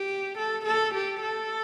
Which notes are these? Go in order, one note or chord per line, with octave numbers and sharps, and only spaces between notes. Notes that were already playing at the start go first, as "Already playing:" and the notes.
Already playing: G4
A4
A4
G4
A4